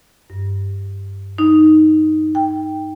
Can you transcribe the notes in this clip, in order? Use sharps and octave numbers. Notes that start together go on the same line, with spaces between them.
G2
D#4
G5